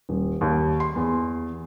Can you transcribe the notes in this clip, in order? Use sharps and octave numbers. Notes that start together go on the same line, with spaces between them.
D#1
D#2
C6
E2